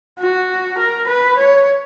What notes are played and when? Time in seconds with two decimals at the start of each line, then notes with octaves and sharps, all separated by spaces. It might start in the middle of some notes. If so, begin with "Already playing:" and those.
0.19 F#4
0.78 A#4
1.08 B4
1.37 C#5